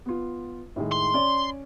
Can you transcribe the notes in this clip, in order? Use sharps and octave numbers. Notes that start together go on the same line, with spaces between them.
B3 F4
A2 D#3 G#3
C6
C#4 D5